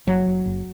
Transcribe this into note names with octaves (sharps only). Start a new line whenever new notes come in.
F#1 F#3
F#1
F#1